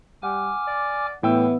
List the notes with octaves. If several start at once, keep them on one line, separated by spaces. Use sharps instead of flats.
G3 F#5 G#5 D6 F6
D5
A2 E3 B3 G5 E6